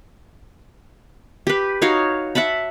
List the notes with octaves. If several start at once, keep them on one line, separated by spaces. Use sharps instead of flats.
G4 B4
D#4 F#4 C#5 F5
E5 F#5 A5 B5